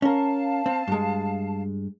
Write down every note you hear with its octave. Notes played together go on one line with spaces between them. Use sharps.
C#4 A#4 F5 A5
C4
G2 G#3